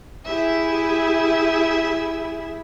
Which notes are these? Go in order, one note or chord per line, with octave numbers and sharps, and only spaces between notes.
E4 G4 G#4 E5